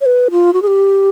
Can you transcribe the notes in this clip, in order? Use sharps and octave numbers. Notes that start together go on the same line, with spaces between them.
C#5
B4
F4
F#4
G#4
G4